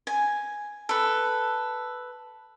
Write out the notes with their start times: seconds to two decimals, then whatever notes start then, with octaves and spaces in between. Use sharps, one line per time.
0.07 G#5
0.89 A4 B4